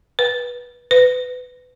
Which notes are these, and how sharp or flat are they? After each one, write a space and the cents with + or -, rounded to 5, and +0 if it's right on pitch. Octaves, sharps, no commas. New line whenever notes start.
B4 -20
B4 +25